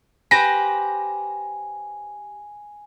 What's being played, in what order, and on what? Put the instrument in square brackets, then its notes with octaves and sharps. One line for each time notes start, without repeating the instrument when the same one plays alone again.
[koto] G4 B4 C5 [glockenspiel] G#5 [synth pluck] A#6